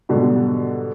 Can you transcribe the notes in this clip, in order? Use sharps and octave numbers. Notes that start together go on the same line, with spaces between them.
G#2 B2 D3 F#3 G3